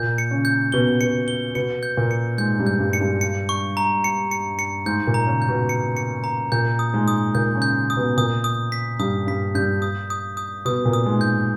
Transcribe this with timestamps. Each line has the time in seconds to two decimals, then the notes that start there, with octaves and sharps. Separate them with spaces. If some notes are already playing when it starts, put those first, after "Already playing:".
Already playing: A#2 A#3 G6
0.18 C#7
0.31 C#3 C#4
0.45 G6
0.72 B2 B3 G7
1.01 B2 B3 C#7
1.28 G7
1.55 B2 B3 C#7
1.83 G6
1.97 A#2 A#3
2.11 C#7
2.38 G#2 G#3 G6
2.59 G2 G3
2.67 G6
2.80 G2 G3
2.93 C#7
3.00 G2 G3
3.21 C#7
3.49 C#6
3.77 A#5
4.04 C#7
4.31 C#7
4.59 C#7
4.86 G#2 G#3 G6
5.07 A#2 A#3
5.14 A#5
5.27 C#3 C#4
5.42 G6
5.48 B2 B3
5.69 C#7
5.97 C#7
6.24 A#5
6.52 A#2 A#3 G6
6.79 D#6
6.94 G#2 G#3
7.08 D#6
7.35 A#2 A#3 G6
7.55 C#3 C#4
7.62 G6
7.90 D#6
7.97 B2 B3
8.17 A#2 A#3 D#6
8.44 D#6
8.72 B6
8.99 G2 G3 D#6
9.27 G2 G3 B6
9.55 G2 G3 G6
9.82 D#6
10.10 D#6
10.37 D#6
10.65 B2 B3 D#6
10.85 A#2 A#3
10.93 D#6
11.06 G#2 G#3
11.21 G6